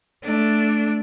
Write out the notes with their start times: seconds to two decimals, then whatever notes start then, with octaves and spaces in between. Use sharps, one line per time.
0.24 A3 D4